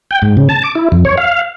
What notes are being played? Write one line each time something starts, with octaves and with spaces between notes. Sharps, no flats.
G5
G#2
C#3
A5
D6
E4
F2
C#5
F5